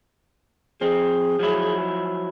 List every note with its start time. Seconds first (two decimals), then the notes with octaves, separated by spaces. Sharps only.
0.81 F3 C4 G#4
1.39 F3 F#3 E4